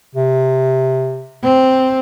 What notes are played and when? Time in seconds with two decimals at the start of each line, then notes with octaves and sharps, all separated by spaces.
0.15 C3
1.42 C4